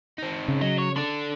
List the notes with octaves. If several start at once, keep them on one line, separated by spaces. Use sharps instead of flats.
C4 D#4
C#3
F#3 D#5
C#5
D3 D4 A4